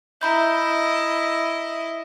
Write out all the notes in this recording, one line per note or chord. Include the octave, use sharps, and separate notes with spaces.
E4 D#5 A#5 B5 G6